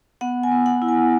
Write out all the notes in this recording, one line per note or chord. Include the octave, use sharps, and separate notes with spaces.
B3 F#5
G#5
B3
F#5
E4
G#5